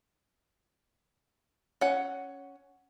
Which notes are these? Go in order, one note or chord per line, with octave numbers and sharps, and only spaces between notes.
C#4 F#5